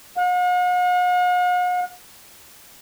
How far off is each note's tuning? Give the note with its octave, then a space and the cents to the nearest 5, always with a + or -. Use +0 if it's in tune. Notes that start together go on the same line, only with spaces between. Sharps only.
F#5 -45